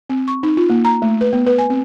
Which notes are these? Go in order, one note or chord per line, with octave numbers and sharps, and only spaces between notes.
C4
C#6
D#4
F4
A#3
A#5
A3
B4
B3
B4
G#5
C4